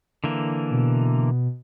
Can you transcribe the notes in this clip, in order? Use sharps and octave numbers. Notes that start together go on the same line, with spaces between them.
D3 E3 A#3
B2